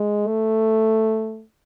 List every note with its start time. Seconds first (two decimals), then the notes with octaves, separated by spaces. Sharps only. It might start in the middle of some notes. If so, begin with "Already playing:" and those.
Already playing: G#3
0.27 A3